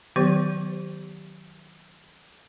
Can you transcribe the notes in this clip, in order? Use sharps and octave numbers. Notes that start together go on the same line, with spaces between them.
D#3 F#3 B3 G4 C5 C#6